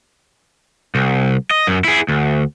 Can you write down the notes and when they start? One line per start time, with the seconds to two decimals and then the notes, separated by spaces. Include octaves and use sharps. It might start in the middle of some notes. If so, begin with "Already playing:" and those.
0.95 C2
1.51 D#5
1.67 F#2
1.84 E4 G#4
2.08 D2